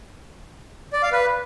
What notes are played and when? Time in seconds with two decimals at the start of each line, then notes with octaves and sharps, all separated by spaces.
0.93 D5
1.03 F5
1.12 B4